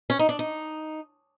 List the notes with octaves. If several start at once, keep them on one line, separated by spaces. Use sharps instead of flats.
C#4
D#4
D4
D#4